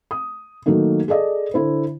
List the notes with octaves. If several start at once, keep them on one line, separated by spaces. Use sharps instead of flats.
D#6
D#3 F#3 A3 A#3 D#4
G#4 A4 D5 D#5
D3 E4 C5